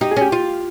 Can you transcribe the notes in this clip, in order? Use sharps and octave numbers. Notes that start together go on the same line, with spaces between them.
D#4 G4
G#4
C#4 G4
F4